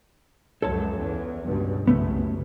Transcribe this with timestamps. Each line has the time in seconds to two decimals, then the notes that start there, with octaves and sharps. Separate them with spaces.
0.62 C#2 F#2 A4 C#5 A5
0.96 E2
1.45 C#2 G2 B2
1.87 C2 F#2 C#3 A3 B3